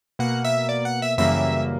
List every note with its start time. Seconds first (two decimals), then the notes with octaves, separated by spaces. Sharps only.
0.19 B2 A#3 F#5
0.45 E5
0.69 D5
0.85 F#5
1.02 E5
1.18 F#2 C#3 E3 G3 A#3 E5